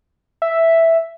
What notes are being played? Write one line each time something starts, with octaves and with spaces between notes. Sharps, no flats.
E5